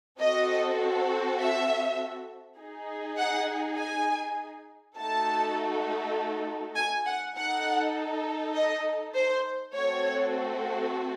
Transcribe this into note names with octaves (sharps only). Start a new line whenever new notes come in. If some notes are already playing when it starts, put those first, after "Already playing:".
C4 F#4 A4 D#5
E5
D#4 G#4
F#5
G#5
A3 D#4 F#4 A4 A5
G#5
F#5
D#4 A4 F#5
D#5
C5
A3 C4 F#4 A4 C#5